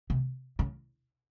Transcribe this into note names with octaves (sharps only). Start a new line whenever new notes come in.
C3
C#3